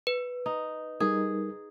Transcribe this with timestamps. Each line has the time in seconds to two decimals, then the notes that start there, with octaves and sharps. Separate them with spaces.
0.07 B4
0.46 D#4
1.00 G3 D#4 G#4 A#4